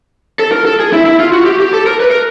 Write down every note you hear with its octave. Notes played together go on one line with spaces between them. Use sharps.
A4
A#4
A4
G#4
E4
E4
F4
F#4
G4
G4
A4
A#4
B4
A#4